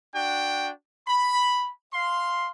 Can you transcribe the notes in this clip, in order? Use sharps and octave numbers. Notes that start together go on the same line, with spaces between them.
D4 F#4 G5
B5
F5 C6